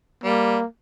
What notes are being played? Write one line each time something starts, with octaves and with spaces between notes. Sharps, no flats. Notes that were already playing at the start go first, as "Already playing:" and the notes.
G3 A#3